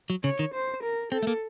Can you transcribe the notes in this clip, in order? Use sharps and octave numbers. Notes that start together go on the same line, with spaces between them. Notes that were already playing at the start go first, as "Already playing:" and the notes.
F#3
C#3 C#5
D#3
C5
A#4
C4 A4
A3
A#3